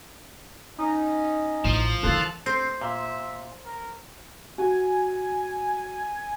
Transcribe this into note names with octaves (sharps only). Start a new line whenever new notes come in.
C#4 D#4
A1 F3
D#3 E3 F4 A4 A5 F#6
C4 C5
A#2 E5
A#4
F#4 G#5